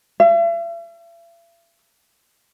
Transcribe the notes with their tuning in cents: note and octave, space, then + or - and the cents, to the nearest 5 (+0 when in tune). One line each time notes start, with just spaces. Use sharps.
E5 +45